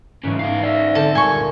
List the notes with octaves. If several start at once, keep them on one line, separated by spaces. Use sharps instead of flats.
C2 G#2 C#3 E3 C#4
B3 D#4 F5
D5 E5 G#5
A#6
D3 C4 A4
D2 G2 A#2 G#5 C#6